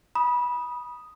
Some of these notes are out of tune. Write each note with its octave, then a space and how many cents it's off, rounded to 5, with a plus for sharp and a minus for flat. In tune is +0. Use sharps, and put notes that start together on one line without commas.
B5 -20 D#6 +0